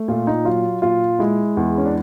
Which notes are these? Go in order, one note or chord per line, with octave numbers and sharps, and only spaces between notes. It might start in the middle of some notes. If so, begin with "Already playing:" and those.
Already playing: A3
A#2 F4
D#4
F#3 F4
A#2 F4
G#3 E4
E2
C#4
D4